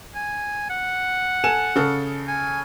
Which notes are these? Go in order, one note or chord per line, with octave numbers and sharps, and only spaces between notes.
G#5
F#5
A4 G#5 E7
C#3 A4
G#5